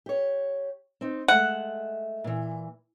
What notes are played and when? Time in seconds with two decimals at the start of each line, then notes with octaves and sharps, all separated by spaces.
0.06 G4 C#5
1.01 C4 D#4
1.28 G#3 A3 E5 F#5
2.24 A#2 E3